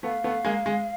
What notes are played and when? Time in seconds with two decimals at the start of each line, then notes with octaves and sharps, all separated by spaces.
0.03 A3 B3 F5
0.24 A3 B3
0.45 G#3 A#3
0.66 G#3